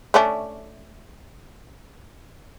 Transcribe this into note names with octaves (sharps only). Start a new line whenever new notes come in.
A3 C#4 D4